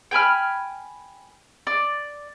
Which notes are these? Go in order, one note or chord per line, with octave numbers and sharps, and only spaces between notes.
G5 G#5 B5 F6
D5